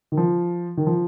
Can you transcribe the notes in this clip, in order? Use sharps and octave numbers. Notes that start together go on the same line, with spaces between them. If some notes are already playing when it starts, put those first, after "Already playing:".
D#3
F3
D#3
F3